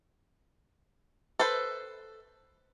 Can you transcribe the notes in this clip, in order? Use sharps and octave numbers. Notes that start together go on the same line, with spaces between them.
A4 B4 C5